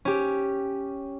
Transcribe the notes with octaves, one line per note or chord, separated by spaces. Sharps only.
C#4 G4